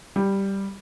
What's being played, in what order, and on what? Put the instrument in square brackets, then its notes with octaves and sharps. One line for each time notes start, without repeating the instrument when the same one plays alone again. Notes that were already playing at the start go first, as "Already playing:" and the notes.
[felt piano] G3